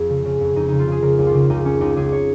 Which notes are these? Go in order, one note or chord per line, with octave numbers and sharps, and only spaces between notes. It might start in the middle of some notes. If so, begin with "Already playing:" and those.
Already playing: F2 F4 G#4
C#3
C#3
F2
F2 D#4
C#3 D#4
F4
C#3 G#4
C#3 A#4
C#2
F4
C#3
C#2 D#4
C#2 C#4
C#2 D#4
C#2 G#4
C#5